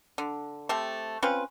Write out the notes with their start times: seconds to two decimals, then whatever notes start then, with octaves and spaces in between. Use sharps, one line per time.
0.18 D3
0.69 A3 C4 G4
1.22 C4 C#4 F4 B4